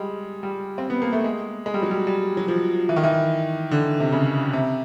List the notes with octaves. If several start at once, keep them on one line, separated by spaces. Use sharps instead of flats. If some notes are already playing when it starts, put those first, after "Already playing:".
Already playing: G3 G#3
G3
C4
B3
A#3
A3
G#3
G#3
G3
F#3
G3
G3
F#3
F3
E3
D#3
E3
D3
C3
C#3
C3